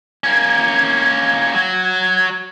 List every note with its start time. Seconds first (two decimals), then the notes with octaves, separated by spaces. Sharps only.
0.24 A#3 C#4 G#6
1.54 F#3 F#4